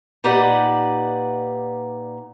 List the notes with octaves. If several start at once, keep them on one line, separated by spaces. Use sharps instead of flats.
A#2 D#4 G4 B4 D5 F#5